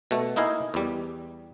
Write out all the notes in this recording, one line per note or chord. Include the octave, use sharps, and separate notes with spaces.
B2 A3
A#3 D#4 E4 D#5 F5 G#5
E2 G3